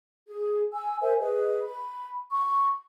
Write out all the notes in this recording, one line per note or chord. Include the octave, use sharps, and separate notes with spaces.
G#4
G#5 E6
A#4 C5 E5 G#5
G#4 B4 D#5
B5
C#6